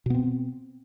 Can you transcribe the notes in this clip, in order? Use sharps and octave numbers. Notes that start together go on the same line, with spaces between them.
B2 B3 C4